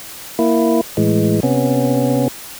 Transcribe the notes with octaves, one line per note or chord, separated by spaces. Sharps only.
A#3 E4
A2 E3 G#3
C3 B3 C#4